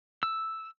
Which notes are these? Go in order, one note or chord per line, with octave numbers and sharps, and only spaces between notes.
E6